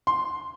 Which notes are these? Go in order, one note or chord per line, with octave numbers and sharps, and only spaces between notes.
C6